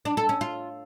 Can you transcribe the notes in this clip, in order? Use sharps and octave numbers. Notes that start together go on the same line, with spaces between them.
D4
A4
C#4
F4